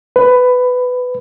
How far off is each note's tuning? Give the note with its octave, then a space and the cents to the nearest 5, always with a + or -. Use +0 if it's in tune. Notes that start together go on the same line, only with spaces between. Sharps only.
B4 +15